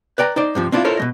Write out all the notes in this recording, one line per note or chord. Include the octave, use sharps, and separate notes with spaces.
B4 D5 G5 A#5
D#4 C5 D5
G2 C3 F3
C4 D4 E4 F4
E4 F4 A4 A#4 C5 C#5
B2 A3 D#5